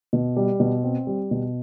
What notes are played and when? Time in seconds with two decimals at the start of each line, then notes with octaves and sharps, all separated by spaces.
0.13 B2
0.36 G3
0.60 B2
0.84 C4
1.07 G3
1.31 B2